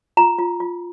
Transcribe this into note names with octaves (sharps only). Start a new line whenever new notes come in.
F4 A#5
F4
F4